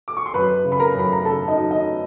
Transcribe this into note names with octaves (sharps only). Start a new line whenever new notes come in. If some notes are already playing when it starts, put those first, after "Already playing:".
D6
C#6
C6
F#2 B4 B5
C#3
B5
A#4 A#5
F#2 B5
A#5
C#3 A4 A5
D#4 D#5
F#3
D#4 D#5